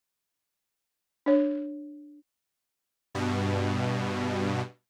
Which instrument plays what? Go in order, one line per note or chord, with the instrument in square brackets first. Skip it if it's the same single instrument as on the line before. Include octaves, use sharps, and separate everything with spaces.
[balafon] D4 C#5
[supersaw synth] G2 B2